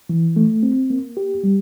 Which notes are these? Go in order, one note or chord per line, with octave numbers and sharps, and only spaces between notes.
E3
A3
C4
A#3
G4
G3